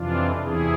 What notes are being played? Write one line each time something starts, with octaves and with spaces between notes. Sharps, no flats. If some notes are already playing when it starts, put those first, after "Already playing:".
Already playing: F2 C3 E3 D4 F4
E2 C3 E3 E4 G#4